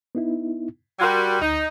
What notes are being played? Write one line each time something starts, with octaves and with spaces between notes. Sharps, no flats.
B3 D#4 E4
G3 F#4 A#4 C6 G#6
D2 D#4